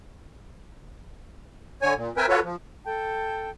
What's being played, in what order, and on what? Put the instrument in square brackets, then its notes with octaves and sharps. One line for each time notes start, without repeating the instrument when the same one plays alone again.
[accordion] D3 C#5 G#5
A#2
C4 A#4 B4 E5 G5 G#5
F4 F#4 A4 B4 C#5
F3
[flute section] A4 A5 [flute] G5